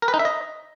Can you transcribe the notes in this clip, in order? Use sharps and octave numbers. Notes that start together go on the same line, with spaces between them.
A#4
B4
D#4
E5
D#5